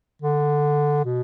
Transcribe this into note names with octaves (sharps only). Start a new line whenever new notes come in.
D3
B2